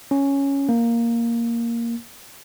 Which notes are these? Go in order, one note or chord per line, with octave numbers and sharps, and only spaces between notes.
C#4
A#3